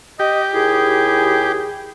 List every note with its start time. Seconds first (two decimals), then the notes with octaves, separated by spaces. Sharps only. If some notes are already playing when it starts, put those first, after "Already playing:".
0.19 G4 D#5
0.54 D#2 E4 G#4